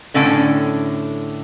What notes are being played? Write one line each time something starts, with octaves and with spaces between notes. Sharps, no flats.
A2 D3 C#4 G5